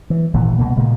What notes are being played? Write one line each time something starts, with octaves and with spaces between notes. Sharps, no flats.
E3
G#1 A#2 E3
C2 B2 A#3
A#2 C#3 G#3